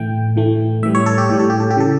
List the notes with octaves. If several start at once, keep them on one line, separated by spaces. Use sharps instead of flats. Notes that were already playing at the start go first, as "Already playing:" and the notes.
Already playing: A2 E3 A3 G5
A2 E3 A3
A2 E3 G3 E5
C#5
A4
G4
A2 E3 G3 G4
A4
G4
A4
G4
C#3 E3 A4